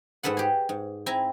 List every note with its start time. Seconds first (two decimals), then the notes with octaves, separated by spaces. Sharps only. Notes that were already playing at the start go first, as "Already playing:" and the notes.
0.23 G#2 G#3 A4 B4 F#5
0.37 G4 G#4
0.69 G#2
1.06 C4 E4 G#5 A#5